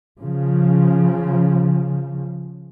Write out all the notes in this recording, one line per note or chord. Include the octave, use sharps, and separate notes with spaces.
C#3 F3